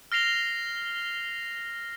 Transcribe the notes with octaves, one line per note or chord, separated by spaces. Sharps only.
F6 A#6 C7 F7 G7